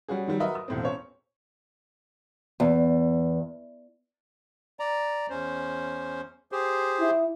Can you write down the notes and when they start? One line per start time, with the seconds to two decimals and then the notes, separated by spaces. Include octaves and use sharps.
0.08 G3 C#4 F#4 G#4
0.28 D#3 F#3 G3
0.40 F#4 A#4 B4 D#5 E5
0.55 D#6
0.68 E1 A2 C4
0.83 C#4 C5 C#5
2.60 E2
4.80 D5 A#5
5.30 E2 C#4 C5
6.52 G4 G#4 C5
7.00 E4